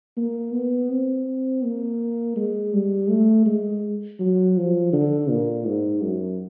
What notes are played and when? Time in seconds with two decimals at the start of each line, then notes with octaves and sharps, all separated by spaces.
0.17 A#3
0.53 B3
0.90 C4
1.64 A#3
2.36 G#3
2.73 G3
3.10 A3
3.46 G#3
4.20 F#3
4.57 F3
4.93 D3
5.30 A#2
5.67 G#2
6.02 F#2